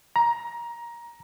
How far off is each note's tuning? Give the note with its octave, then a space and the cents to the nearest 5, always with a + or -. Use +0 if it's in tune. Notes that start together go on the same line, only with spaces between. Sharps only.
A#5 +15